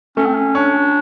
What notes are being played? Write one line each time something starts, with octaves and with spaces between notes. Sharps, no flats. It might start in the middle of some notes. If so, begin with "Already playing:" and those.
A3 C#4
C4
C#4
C#4 D4